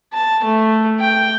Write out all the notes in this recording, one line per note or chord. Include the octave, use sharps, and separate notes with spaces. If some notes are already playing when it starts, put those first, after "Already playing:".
A5
A3
G5